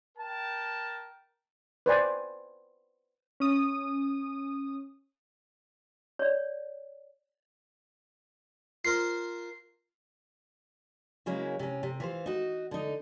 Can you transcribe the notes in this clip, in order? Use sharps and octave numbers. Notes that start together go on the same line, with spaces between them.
A#4 G5 A5
B4 C5 D5 G#5
C#4 D#6
C#5 D5
F4 A#4 C5 C7
C#3 F#3 G#3 A#3 C#4 E4
C3 C#4
C3
E3 F4 C5
D#4 F#4
D3 D#4